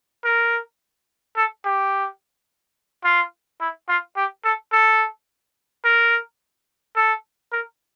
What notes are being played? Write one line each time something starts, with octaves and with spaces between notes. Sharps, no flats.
A#4
A4
G4
F4
E4
F4
G4
A4
A4
A#4
A4
A#4